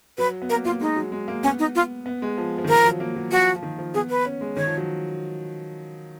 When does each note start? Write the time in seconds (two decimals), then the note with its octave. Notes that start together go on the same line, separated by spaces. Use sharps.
0.18 F#3 B4
0.42 B3
0.49 A#3 A#4
0.65 A#3 F4
0.81 G#3 D#4
0.96 F#3
1.12 G#3
1.28 A#3
1.43 B3 C#4
1.59 D#4
1.75 F4
2.06 B3
2.22 G#3
2.38 F3
2.58 F3
2.64 D#3
2.68 F3 A#4
2.84 F#3
3.00 A#3
3.16 F#3
3.31 F3 F#4
3.56 F3
3.63 D#3
3.79 F3
3.94 B3 G#4
4.10 B4
4.25 C#4
4.41 G#3
4.56 D#3 C#5
4.67 F3
4.78 F#3